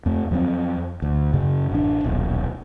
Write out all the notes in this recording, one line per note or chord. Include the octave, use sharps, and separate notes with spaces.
F2 A3
F2 F#3 G#3 C4
D2
F#2 C#3
A1 D4
D#1 B1